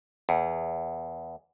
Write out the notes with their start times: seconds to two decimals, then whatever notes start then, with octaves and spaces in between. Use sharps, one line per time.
0.29 E2